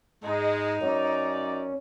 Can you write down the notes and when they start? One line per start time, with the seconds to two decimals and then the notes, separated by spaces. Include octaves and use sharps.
0.24 G#2 G#3 D#4
0.82 F#2 C#4 D5